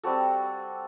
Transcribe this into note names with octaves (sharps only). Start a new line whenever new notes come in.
G3 C4 F#4 A4